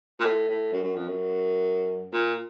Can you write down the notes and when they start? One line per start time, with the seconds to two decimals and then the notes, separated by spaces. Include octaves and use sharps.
0.20 A#2
0.25 A2
0.49 A2
0.73 F#2
0.84 F#2
0.96 F2
1.08 F#2
2.13 A#2